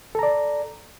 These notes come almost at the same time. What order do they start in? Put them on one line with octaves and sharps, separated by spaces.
A4 A#5 D5